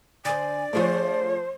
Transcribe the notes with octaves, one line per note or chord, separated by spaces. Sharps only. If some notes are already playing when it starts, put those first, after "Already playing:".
D3 C5 D5 G#5
F3 A3 D4 G#4 C5 C#5